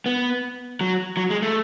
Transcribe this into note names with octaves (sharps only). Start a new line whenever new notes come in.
B3
F#3
F#3
G#3
A3